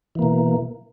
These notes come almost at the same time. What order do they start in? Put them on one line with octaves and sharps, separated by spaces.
E3 A#3 B2